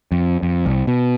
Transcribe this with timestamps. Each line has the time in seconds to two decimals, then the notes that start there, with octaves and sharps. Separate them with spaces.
0.12 F2
0.42 F2
0.66 C2
0.87 B2